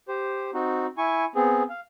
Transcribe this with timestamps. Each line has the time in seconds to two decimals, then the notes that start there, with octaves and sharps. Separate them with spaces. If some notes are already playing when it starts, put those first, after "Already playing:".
0.08 G4 C5
0.54 C4 D#4 F#4
0.98 E4 G#5 C#6
1.35 B3 C4 G#4
1.69 F5